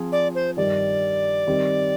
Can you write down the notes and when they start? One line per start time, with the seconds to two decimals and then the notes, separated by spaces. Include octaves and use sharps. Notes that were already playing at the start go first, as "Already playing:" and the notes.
Already playing: F3 C4 F4 G#4
0.12 D5
0.35 C5
0.57 G2 D#3 G3 D5
1.47 D#3 G3 C4